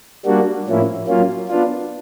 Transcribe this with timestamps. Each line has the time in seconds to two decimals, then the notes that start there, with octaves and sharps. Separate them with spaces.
0.26 G3 A#3 D4 F#4
0.67 A2 F3 A#3 C#4 E4
1.08 F#3 A#3 C#4 F4
1.48 B3 D4 F4